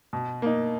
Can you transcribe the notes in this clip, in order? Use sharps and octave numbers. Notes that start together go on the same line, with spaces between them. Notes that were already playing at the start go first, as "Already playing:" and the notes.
B2
A#3 D#4